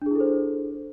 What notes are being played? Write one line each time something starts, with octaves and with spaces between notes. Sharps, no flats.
D4 E4 G#4 A4 C5